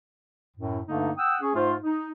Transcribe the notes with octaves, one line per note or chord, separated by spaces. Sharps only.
F#2 A2
G2 D3 A3 A#3 D#4
F#5 G5 D#6 E6
C#4 G#4
G#2 A3 F4 C5
D#4